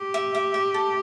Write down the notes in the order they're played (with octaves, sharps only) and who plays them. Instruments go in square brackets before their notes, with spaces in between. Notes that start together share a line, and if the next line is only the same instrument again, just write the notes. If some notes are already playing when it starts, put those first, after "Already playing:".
Already playing: [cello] G4
[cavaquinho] E5
E5
E5
A4